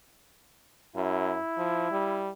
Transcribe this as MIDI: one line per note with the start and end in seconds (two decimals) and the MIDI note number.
0.96 1.37 42
0.96 2.33 64
1.58 1.89 53
1.91 2.30 55